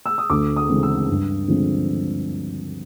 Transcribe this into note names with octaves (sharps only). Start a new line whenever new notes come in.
E6
D#6
D2 D6
D#6
C#3 E3 G#3 C4
E6
G2
D3 F3 G#3 C4